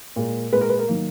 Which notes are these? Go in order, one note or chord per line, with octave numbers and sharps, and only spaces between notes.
A#2 G#3
A#2 G#3 B4
A#4
B4
A#4
D#3 F#3 A#3